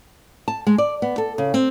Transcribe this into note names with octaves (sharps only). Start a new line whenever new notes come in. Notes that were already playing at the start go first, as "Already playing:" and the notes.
A5
G#3
D5
B3
A4
C#3
C4